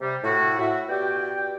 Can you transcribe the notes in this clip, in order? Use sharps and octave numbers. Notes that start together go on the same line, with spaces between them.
C3 G3
A2 E4 F#4
F#4 E5
B2 G4 D5 G5